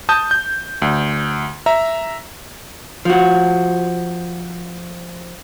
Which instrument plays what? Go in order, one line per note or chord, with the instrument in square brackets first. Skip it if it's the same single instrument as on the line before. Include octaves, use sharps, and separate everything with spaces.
[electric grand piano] A5 D#6 G6
G6
D2
E5 A#5
[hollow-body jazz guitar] F3 F#4